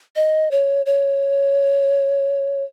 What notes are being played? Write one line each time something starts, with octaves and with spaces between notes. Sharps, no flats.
D#5
C#5
C#5